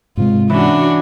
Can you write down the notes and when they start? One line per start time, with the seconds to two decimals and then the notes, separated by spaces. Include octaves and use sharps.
0.17 G#2 C3 G#3 F4
0.50 E3 C#4 D4 F#4